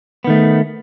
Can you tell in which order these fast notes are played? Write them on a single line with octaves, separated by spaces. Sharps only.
B3 D#3 A3